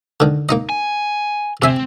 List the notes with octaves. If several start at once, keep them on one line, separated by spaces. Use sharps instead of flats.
D3 D#3
A#3 D#4 D#5
G#5
C3 C4 E5 G#5